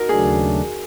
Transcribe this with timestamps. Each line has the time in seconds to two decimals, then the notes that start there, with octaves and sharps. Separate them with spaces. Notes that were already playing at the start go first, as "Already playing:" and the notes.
Already playing: D#4 F#4 A#4
0.09 D#2 C#3 F#3 A3 D4 G#4